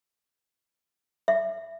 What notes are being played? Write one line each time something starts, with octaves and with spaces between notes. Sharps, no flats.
E5